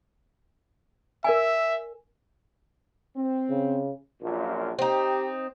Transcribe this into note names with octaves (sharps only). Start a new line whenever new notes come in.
A#4 D5 E5 G#5
C4
C#3
A#1 F#2 A#2
C4 D#4 G4